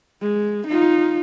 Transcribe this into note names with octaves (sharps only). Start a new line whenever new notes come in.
G#3
D#4 F4